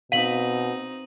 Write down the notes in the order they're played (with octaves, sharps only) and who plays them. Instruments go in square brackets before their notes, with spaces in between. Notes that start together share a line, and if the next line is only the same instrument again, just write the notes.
[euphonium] B2 [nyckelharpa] C4 D#4 [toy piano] F5 [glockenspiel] D#7 F#7